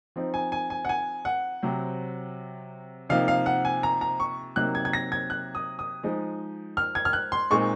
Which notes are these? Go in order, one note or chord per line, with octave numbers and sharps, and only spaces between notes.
F3 C4 D#4
G#5
G#5
G#5
F#5
G#5
F#5
C3 F#3 C4
C3 F3 A#3 D#4 F5
F5
F#5
G#5
A#5
A#5
C#6
C3 F#3 A#3 D#4 F#6
G#6
G#6
A#6
G#6
F#6
D#6
D#6
F3 G#3 D#4
F6
G#6
F6
F#6
C6
A#2 G#3 C4 D#4 C#6